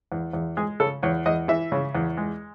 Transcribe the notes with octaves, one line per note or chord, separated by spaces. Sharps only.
E2
E2
G#3 G#4
C#3 A4
E2 C#5
E2 D#5
E3 E5
C#3
E2
G#3